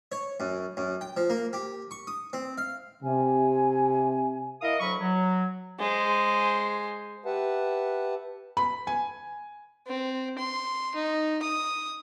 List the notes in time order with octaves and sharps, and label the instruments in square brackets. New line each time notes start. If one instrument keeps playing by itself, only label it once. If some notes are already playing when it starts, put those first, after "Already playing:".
[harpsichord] C#5
F#2
F#2
G5
F3
A#3
G4
C#6
D#6
C4
F5
[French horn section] C3 [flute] G#5
[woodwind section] E4 A#4 D#5 F5 D#6
D2 F#3 B5 C#6
F#3
[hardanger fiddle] G#3 C5
[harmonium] G4 B4 E5 F#5 A5
[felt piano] B5
G#5
[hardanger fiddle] C4
C6
D#4
D#6